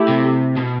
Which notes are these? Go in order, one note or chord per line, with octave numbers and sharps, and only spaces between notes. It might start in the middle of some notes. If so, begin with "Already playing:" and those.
Already playing: A3 E4 G4
C3
B2